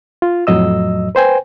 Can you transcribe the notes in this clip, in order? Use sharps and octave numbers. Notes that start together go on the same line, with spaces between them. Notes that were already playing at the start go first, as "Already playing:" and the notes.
F4
F2 A2 F#3 D#5 E6
B4 C5 G5 G#5